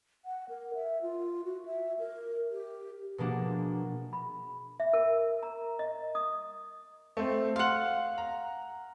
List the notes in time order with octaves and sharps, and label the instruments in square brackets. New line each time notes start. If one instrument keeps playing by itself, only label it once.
[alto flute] F#5
A#4
E5
F4
F#4
E5
A#4
G4
[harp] B2 F3 G#3 A#3 D4 F#4
[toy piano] B5
E5
A#4
A#5
D#5
D#6
[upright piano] A3 C4
[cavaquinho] F5 F#5 [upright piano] C6 F#7
[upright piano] A#5